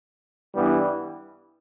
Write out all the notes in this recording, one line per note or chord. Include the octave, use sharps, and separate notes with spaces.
G2 E3 G3 B3